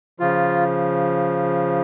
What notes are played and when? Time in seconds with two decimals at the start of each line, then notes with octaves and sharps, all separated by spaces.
0.20 C#3 F3 F4